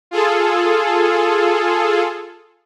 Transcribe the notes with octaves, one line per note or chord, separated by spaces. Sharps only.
F4 G#4 A4